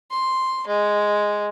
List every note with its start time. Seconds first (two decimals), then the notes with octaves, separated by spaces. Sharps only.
0.11 C6
0.67 G#3